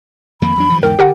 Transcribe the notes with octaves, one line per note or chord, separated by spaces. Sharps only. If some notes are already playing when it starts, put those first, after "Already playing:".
F2 D#3 A#3 B5
E2 F#3 D4
G2 E3 F3
E2 G#2 D3 A#4 G5
D3 G4 A#4 F#5